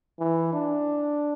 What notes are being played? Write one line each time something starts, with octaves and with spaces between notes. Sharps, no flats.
E3
D4